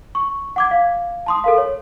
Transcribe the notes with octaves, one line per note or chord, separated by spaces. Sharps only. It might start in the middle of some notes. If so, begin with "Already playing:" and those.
C#6
F#5 D6 G#6
F5
A5 C6 D#6
A4 A#4 F5
C#5